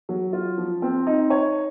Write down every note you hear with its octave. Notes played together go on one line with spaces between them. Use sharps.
F#3
F4
F3
C4
D#4
C#5